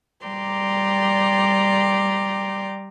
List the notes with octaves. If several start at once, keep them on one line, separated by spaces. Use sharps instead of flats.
G3 D5 G5 A#5 C6 D6